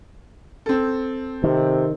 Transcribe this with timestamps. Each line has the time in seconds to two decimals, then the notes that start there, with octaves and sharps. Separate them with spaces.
0.66 C4 A4
1.44 C3 D#3